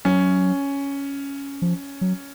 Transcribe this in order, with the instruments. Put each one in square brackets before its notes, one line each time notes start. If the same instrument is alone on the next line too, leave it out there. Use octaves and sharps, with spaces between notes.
[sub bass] F#3 [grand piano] C#4
[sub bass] F3
F#3